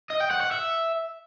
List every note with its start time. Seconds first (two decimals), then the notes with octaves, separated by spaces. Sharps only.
0.10 D#5
0.20 G5
0.31 F#5
0.41 F#5
0.51 E5